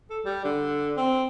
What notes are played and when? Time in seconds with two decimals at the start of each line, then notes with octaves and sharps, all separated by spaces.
0.10 A4
0.25 G3
0.44 D3
0.97 C4